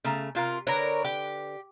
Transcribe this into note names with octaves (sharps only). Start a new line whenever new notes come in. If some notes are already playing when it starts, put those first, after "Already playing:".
C#3 A3 A#5
C3 F4 A#4
D3 A#4 B4 C#5
G4